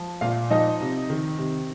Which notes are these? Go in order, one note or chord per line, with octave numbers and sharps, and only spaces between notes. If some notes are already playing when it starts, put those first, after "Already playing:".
Already playing: F3
A#2 F4 F5
F3 D#4 D#5
C3
D#3
C3